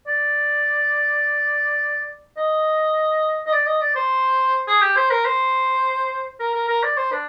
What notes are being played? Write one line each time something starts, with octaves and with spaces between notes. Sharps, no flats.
D5
D#5
D#5
D5
D#5
D5
C5
G#4
G4
C5
A#4
C5
A#4
A#4
A#4
D5
C5
D4